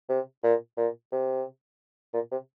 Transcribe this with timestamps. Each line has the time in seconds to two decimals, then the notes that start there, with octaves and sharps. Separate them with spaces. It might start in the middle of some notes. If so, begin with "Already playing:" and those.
0.09 C3
0.43 A#2
0.77 A#2
1.12 C3
2.14 A#2
2.31 C3